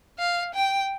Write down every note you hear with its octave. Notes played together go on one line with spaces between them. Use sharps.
F5
G5